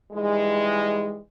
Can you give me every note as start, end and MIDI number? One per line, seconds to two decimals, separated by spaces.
0.13 1.18 44
0.13 1.18 52
0.13 1.18 55
0.13 1.18 56